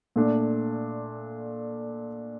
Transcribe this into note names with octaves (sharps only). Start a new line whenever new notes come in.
A#2 A3 D4